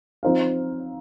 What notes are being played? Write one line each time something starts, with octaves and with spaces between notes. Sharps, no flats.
F3 C4 D#4 C5 F5